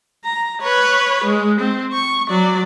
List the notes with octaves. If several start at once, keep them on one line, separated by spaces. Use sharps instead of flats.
A#5
B4 C#5
G#3
C4
C#6
F#3 D5